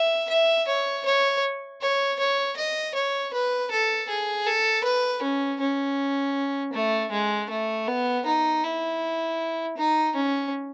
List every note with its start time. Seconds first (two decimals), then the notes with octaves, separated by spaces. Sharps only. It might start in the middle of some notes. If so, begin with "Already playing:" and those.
Already playing: E5
0.30 E5
0.67 C#5
1.05 C#5
1.81 C#5
2.19 C#5
2.57 D#5
2.95 C#5
3.33 B4
3.71 A4
4.09 G#4
4.46 A4
4.85 B4
5.22 C#4
5.60 C#4
6.73 A3
7.12 G#3
7.50 A3
7.88 B3
8.26 D#4
8.63 E4
9.77 D#4
10.15 C#4